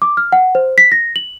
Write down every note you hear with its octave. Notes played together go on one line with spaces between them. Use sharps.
D6
F6
F#5
C5
B6
A#6
F#7